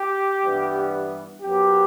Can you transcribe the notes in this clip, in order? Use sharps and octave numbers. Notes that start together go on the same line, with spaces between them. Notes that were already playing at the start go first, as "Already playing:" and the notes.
Already playing: G4
G2 E3 G3 B3
F#2 F#3 B3 G4